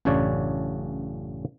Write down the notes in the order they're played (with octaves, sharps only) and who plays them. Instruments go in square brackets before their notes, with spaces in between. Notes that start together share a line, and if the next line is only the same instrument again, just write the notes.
[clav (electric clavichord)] A1 F#2 C#3 D4 C#5 D5